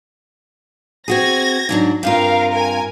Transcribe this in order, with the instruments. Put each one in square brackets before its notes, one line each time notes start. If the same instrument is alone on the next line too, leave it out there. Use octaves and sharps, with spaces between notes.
[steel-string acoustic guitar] C4 F#4 G#4 [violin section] G#6 A#6
[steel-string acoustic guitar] G#2 F#3 D4
[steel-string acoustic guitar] G2 C3 F4 [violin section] A#4 F5
[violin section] A#4 G#5